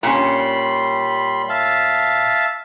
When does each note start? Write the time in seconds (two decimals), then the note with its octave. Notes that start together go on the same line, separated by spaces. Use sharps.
0.03 A#2 G3 C#4 B5 C6
1.49 E5 F5 A5